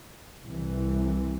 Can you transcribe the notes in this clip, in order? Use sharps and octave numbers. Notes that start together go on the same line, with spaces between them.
C2 C3 E3